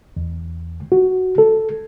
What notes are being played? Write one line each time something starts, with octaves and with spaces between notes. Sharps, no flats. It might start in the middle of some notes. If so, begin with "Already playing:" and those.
E2
F#4
A4